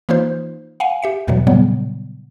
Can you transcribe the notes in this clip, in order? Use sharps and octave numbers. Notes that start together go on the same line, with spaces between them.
E3 A#3 D#4 F4 C5
F5 F#5 G#5
G4 E5 C#7
E2 B2 D3 E3 F#3
A#2 C#3 F#3 G3 B3